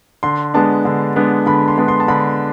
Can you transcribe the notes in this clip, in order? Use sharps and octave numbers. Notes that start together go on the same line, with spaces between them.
D3 C6
G#3 B3 D4 A5
D3
G#3 B3 D4
D3 B5
C6
G#3 B3 D4
C6
A5
D3 B5